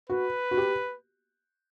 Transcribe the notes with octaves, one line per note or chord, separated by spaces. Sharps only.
F#4 B4
F#4
G4